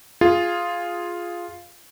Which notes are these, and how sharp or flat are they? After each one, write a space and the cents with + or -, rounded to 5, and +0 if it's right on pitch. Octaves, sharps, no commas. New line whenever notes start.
F4 +0 G#4 +0